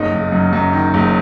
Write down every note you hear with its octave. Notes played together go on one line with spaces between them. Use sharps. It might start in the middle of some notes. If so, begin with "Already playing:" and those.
Already playing: F#1 B1 D#4
F#1
F#2
F#2
D#3
F#1